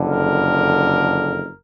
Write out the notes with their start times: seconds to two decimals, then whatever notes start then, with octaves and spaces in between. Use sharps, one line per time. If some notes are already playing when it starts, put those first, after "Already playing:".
Already playing: F#1 F2 D3
0.09 A#4